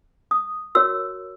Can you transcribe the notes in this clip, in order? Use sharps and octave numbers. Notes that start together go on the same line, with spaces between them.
D#6
F#4 A#4 C#5 E6